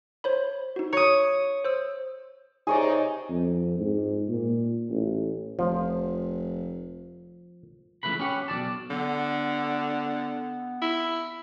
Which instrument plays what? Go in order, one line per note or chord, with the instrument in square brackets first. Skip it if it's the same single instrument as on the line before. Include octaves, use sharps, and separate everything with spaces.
[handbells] C5 C#5 B5
D#4 F#4
[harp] C#5 D#6 [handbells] A#5
[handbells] C5 E6
[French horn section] C3 D#4 [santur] G#4 C#5 D5
[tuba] F2
G#2
A#2
A1
[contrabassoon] F1 [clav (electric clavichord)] F3
[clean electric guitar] C#2 G#2 E3 A3 B4 B5
C#4 G4 F#5
B1 E3 D5 A5
[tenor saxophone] D3 [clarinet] B3
[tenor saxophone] E4